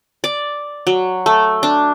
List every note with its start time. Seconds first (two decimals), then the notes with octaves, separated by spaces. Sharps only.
0.24 D5
0.87 F#3
1.26 A3
1.63 D4